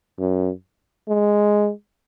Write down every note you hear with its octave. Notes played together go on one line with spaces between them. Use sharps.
F#2
G#3